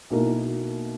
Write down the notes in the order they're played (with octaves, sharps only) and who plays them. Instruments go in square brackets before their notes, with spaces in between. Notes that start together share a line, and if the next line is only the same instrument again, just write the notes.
[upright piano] B1 B2 A#3 E4 A#4